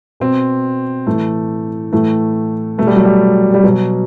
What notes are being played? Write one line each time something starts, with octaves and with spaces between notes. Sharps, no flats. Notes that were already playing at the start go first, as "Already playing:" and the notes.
B2 C4
A2 E3 A3
A2 E3 A3
B2 A3
G3
F#3
G3
G3
B2 F#3